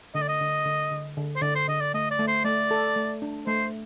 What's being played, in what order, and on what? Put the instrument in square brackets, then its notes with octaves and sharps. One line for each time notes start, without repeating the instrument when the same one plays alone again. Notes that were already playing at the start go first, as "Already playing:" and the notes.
[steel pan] D3 [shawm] D#5
[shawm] D5
D#5
[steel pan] D3
D3
D3
D3
[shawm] C5
[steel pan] D3 [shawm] D5
[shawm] C5
[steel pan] D3 [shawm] D#5
[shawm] D5
[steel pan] A3 [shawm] D#5
[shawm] D5
[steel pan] A3
[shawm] C5
[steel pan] A3 [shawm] D5
[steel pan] A4
A3
D4
[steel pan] A3 [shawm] C5